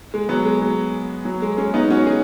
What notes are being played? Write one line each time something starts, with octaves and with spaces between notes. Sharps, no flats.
G#3
F#3 B3
G#3
F#3
F#3
G#3
G#3 C#4
B3 D#4
C#4 F#4
D#4 G#4